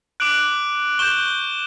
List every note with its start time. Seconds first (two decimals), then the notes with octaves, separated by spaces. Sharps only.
0.20 D6 F#6 D7 F#7
0.99 C#6 G6 E7 G7